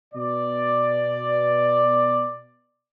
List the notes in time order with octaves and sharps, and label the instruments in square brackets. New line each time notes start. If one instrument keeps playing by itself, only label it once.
[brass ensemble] B2 D5